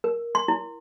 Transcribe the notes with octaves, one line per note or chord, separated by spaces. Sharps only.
A#4
C6
E4